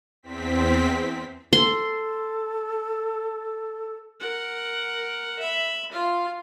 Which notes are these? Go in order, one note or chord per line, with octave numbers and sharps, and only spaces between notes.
E2 C4 B6
A4 C6
A#4 F#5
E5 B5
F4 F5